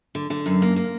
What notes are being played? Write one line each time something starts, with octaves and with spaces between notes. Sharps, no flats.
D3
D3
F#2
A#3
A#3